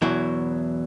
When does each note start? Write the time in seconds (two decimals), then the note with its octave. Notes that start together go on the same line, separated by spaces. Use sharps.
0.02 E2 B2 F#3 E4